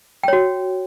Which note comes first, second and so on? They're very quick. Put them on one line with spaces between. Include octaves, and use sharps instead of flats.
G5 C#5 F#4